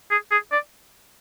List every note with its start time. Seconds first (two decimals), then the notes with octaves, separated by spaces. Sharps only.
0.11 G#4
0.31 G#4
0.52 D5